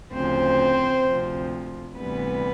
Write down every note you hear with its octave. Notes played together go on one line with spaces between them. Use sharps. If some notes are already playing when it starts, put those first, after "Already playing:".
D2 C#3 F3 C4 C5
D2 C3 F3
D2 C3 E3 G3 B3 B4